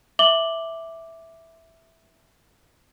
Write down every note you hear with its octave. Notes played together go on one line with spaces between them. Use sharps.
E5 D6 F#7 G7